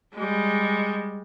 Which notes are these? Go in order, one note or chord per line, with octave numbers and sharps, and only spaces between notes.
G3 G#3